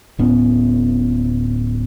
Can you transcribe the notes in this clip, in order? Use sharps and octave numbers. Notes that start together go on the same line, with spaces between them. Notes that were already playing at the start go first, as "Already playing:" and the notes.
D1 A2 B3 C#4